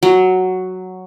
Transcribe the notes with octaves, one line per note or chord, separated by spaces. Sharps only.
F#3